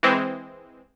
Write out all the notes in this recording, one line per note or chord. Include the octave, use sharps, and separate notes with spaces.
E3 G#3 C4